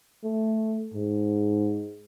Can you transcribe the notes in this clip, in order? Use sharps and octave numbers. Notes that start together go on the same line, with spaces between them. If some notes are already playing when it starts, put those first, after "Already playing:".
A3
G#2